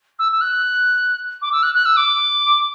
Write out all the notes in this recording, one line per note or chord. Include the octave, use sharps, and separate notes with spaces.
E6
E6
F#6
D6
E6
F#6
F#6
E6
D6